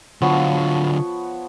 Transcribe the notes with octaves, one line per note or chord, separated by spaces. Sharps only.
D3 F3 F#3 B3 C#5